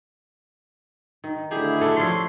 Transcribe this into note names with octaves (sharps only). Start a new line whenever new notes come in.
D#3
D2 D3 E4 G4 G#4
A3 D4 A4 B4
F3 C#4 C6